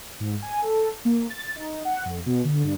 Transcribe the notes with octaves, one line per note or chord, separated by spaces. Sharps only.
G#2
G#5
A4
A#3
A6
D#4
F#5
F2
B2
D3
G2